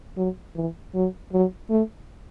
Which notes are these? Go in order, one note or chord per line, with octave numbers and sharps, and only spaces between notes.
F#3
E3
F#3
F#3
A3